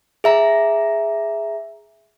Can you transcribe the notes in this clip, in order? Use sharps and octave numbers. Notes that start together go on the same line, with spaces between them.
G#4 E5 A#5